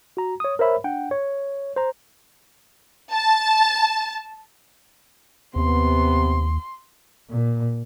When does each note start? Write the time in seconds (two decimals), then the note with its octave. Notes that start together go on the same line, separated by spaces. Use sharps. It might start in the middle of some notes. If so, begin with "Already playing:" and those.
0.17 F#4 A#5
0.40 C#5 D#6
0.59 A#4 C5 C#5 E5 B5
0.84 D4 F#5 G5
1.11 C#5
1.76 C5 A#5
3.12 A5
5.56 D#2 C3 B3 C6
7.30 A#2